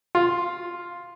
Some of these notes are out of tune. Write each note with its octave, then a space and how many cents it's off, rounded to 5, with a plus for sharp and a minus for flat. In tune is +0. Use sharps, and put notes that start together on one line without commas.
F4 +0